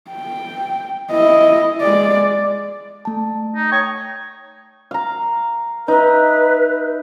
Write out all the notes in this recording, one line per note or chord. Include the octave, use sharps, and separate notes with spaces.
G5
E4 D#5
G#3 D5
A3 A5
D#4
C#5 G5 D#6
F5 A#5
D#4 B4 E5